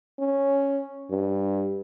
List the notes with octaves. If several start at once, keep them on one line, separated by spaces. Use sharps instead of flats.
C#4
G2